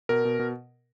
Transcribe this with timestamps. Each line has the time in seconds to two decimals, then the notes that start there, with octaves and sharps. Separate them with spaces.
0.09 B2 A#4
0.25 B2
0.39 B2